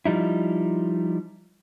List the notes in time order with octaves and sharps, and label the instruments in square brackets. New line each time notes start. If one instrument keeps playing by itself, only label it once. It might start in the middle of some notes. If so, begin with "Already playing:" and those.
[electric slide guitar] F3 G3 D#4 E4